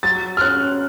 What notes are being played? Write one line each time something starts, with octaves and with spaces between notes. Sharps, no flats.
F#3 A6
F6
C#4 F#6